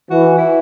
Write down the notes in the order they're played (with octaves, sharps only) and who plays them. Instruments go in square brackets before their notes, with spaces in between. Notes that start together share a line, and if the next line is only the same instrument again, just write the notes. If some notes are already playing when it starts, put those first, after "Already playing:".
[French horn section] E3 [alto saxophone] F#4
[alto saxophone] E4